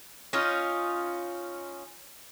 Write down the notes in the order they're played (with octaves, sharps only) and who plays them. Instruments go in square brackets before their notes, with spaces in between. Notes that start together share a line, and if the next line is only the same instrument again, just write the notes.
[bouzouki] C#4 D#4 F4